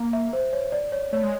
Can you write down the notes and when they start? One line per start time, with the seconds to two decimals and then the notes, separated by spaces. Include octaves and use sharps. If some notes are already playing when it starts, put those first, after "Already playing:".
Already playing: A#3
0.13 E5
0.33 C5
0.53 C#5
0.72 D5
0.92 C#5
1.12 A3 C#5
1.23 G#3